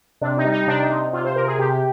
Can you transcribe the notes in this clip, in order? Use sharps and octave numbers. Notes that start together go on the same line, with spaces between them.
C3 D4
D#4
G3
D#4
C3 D4
D#4
C3
C3 F4
C5
C3 A#4
G#4
C3 G4